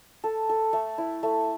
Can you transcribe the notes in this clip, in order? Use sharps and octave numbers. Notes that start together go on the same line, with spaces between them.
A4
A4
A3
E4
A3